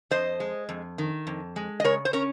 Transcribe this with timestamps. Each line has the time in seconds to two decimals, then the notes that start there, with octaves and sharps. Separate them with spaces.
0.11 F2 C5 D#5
0.40 G#3
0.69 F2
0.98 D#3
1.27 F2
1.56 G#3
1.80 D#5
1.84 C#3 A#4 C#5
2.05 C5
2.13 C#4 A#4 C#5